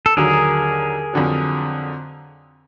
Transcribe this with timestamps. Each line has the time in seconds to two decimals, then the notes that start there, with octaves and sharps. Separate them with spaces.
0.06 A4
0.17 D#2 D3 F#3 G#4 A#4
1.13 F2 D3 F#3